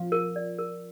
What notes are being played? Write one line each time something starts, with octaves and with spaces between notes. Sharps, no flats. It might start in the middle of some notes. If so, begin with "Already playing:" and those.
Already playing: F3 F4 F5
A#4
D5
A#4